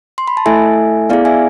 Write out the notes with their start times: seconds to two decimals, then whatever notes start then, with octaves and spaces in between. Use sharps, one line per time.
0.18 C6
0.28 B5
0.37 A5
0.46 A3 E4 A4 E5 G#5
1.10 B3 E4 G#4 D5 F5
1.25 E5 G#5